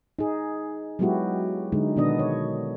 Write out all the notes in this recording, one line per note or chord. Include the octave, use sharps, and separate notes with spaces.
D#4 G#4
F#3 G#3 B3 E4 F#4 G4
D3 G#3 D#4
B2 D#3 B3 D4 D#5
C#5